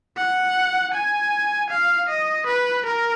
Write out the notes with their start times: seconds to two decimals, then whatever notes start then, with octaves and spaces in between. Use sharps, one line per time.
0.17 F#5
0.94 G#5
1.70 F5
2.08 D#5
2.46 B4
2.86 A#4